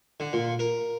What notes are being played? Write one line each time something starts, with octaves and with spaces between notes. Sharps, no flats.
D3
A#2
A#4